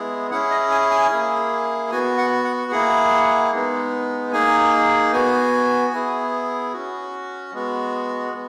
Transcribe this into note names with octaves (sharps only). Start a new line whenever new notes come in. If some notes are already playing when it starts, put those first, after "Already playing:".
Already playing: G#3 B3 E4 G#4
C#4 E4 G#4 F#5
D#5
G#5
G#5
A#3 E4 G#4
B3 F#4 G#5
F#5
F#5
A#3 E4 G#4 F#5
G#3 B3 D#4
A#3 D#4 G#4 G#5
B3 F#4 G#5
B3 E4 G#4
C#4 F#4
G#3 B3 F#4
B3